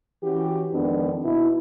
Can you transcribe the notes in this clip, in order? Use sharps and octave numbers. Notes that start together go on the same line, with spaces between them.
E3 C#4 F#4 G4
F2 D#3 G#3 B3 D4
B2 D#4 E4